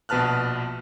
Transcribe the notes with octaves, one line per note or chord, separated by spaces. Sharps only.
A#1 B2 B4 A5 F6 F#6